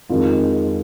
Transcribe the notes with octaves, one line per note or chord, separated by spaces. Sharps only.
F2 D#3 G#3 F4